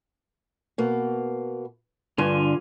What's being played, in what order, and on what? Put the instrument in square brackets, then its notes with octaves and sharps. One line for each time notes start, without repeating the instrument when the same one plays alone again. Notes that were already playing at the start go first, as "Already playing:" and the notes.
[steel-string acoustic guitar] B2 A#3
[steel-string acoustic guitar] G2 [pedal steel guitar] D3 F4 G#5